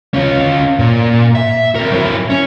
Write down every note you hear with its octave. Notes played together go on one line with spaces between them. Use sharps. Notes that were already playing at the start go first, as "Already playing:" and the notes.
C#4 F4
A#2
E5
C4 A#4
F#3 E4
C#4